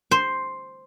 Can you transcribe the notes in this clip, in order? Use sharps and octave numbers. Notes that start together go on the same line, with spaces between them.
C5